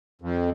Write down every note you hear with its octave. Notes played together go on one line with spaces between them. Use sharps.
F2